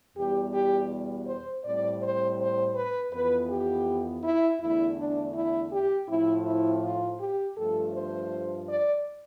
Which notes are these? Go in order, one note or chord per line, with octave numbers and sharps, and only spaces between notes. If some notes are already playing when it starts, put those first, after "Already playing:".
E2 B2 G3 G4
G4
C5
A2 G3 C4 D5
C5
C5
B4
F2 E3 B3 B4
G4
E4
E2 D3 A3 E4
D4
E4
G4
A2 F3 C4 E4
E4
F4
G4
G2 F3 A3 A4
C5
D5